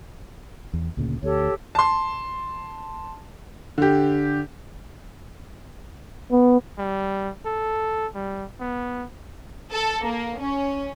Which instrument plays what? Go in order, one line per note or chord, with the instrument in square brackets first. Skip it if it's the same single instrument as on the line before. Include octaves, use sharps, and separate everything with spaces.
[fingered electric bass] E2
D2 A#2 C#3
[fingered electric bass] D2 [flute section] G4 A4 C#5
[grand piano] A5 C6
D3 G4
[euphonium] B3
[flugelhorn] G3
A4
G3
B3
[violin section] A4
A#3
C#4